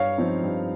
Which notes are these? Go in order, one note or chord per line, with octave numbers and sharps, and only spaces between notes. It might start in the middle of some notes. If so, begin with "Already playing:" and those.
Already playing: G2 C#5 F5
F3 C4 D#4
G2